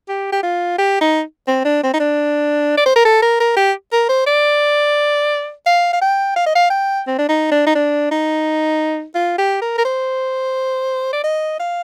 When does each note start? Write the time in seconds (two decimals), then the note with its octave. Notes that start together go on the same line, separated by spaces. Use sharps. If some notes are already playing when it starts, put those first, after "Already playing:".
0.09 G4
0.32 G4
0.43 F4
0.78 G4
1.01 D#4
1.48 C4
1.65 D4
1.83 C4
1.93 D#4
2.00 D4
2.78 D5
2.86 C5
2.96 A#4
3.05 A4
3.22 A#4
3.40 A#4
3.57 G4
3.93 A#4
4.09 C5
4.27 D5
5.66 F5
5.93 F5
6.01 G5
6.36 F5
6.46 D#5
6.55 F5
6.70 G5
7.07 C4
7.18 D4
7.29 D#4
7.52 D4
7.67 D#4
7.75 D4
8.11 D#4
9.15 F4
9.38 G4
9.62 A#4
9.78 A#4
9.85 C5
11.13 D5
11.24 D#5
11.60 F5